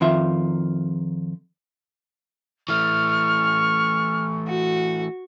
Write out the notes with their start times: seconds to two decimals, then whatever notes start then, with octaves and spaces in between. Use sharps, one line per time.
0.01 F2 D#3 F4 E5
2.69 E3 A3 C#6 F6
4.47 F#4